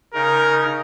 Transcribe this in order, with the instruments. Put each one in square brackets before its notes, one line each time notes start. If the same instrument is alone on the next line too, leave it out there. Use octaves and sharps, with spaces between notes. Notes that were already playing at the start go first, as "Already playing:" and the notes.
[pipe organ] C#3 D#4 [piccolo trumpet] A#4